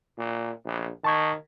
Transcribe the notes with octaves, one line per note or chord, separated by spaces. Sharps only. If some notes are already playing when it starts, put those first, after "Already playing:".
A#2
A#1
D#3 A5 C#6 G#6